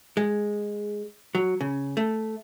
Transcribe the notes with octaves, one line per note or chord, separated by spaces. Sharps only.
G#3
F#3
C#3
A3